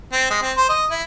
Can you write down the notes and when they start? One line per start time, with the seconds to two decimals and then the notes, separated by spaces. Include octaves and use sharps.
0.13 C4
0.30 G#3
0.42 C4
0.57 C5
0.69 D#5
0.90 E4